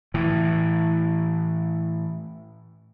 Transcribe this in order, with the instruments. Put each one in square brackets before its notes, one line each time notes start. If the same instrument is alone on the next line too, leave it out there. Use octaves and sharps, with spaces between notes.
[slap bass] A2 E3